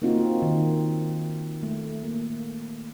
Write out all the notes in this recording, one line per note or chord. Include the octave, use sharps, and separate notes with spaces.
A#3 C4 D#4 F4 F#4
D#3
A3
A#3